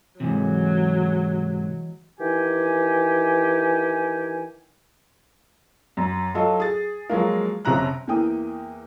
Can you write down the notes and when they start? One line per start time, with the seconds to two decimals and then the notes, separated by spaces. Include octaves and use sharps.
0.20 G#2 C3 E3 F#3 G#3
2.20 D#3 E3 G4 G#5
5.97 F#2
6.34 F#3 F4 A4 D#5
6.60 G#4 A6
7.10 F3 F#3 G#3 A#3
7.65 F#1 C3 C#4 A#5 F#6
8.07 E2 E3 A#3 G5 D#6